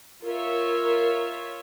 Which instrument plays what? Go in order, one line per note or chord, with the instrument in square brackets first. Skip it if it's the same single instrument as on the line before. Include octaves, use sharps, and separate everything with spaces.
[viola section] F4 C#5 E5 [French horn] A#4